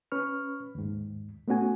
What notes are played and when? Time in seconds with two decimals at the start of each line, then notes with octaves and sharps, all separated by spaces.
0.12 C#4 B4 C#6 F6
0.75 D#2 G#2
1.48 A3 B3 C#4 F#4 G#5